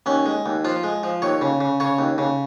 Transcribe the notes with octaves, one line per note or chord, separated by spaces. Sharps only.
D#2 C#4
G#3
D#2
F3 F4
G#3
F3
D#2 C#5
C#3
C#3
C#3 C#5
D#2
C#3